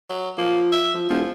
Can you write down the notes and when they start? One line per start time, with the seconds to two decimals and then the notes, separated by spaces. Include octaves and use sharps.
0.09 F#3
0.38 F3 A#3
0.72 E5
0.94 F3
1.09 E1 F3